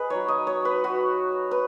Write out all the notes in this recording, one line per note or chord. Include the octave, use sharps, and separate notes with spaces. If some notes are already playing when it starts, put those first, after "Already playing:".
Already playing: G#4 B4 D#5
F#3 D#4 C#5
D#5
C#5
B4
F#4
B4